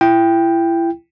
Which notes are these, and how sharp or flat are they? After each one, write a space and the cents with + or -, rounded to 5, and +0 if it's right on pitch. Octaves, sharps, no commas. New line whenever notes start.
E4 +30 G5 +5